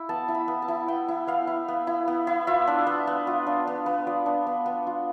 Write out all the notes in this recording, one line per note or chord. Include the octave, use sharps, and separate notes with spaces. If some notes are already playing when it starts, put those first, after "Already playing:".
Already playing: E4
B3 A5
E4
B5
B3
A5
E4
B3 G5
E4
B3 F5
E4
B3
E4
B3
E4
F4 E5
D4
B3
B3
F4
D4
B3
B3
F4 D5
D4
B3
B3
F4